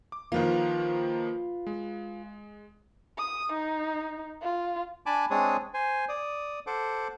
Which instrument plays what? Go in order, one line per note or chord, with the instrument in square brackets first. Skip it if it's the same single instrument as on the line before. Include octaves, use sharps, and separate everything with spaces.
[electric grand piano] D6
[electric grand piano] D#3 F3 A#3 [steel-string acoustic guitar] F4 B4
[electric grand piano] G#3
[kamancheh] D#6
D#4
F4
[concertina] D4 G#5 A5 B5 D6
G#3 C4 D4 G#4 C#5 D#6
C5 G#5
D5 D#6
A4 C5 F#5 D6